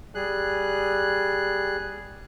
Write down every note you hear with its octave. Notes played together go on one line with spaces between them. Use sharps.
G3 G#4 F#6